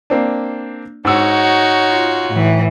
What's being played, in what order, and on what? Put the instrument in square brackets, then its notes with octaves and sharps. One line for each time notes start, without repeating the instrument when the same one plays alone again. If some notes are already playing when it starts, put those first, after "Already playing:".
[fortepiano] A#3 C4 D4
[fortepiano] G#2 E6 [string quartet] D#4 F#4 C#5
[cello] F4
A2 E3